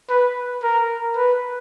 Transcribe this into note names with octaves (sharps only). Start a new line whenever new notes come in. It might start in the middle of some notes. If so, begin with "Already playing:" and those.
B4
A#4
B4